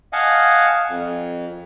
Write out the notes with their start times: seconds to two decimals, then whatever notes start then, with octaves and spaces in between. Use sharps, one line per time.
0.13 D#5 F5 F#5 G#5 A5
0.89 F2